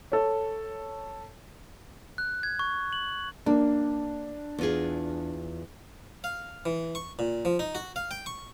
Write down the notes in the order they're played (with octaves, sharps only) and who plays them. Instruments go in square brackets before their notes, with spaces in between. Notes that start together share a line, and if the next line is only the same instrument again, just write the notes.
[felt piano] A4 C#5
[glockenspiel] F#6
G#6
C#6
F#7
[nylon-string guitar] A#3 [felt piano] D4
[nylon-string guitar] E2 F4 G#4
[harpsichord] F5
E3
C#6
A#2
F3
D#4
F#4
F5
G5
C#6